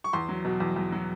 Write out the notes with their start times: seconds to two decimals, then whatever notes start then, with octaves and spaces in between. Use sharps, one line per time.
0.04 C#6
0.13 E2 C6
0.29 F#3
0.45 B2
0.60 E2
0.76 E2
0.92 F#3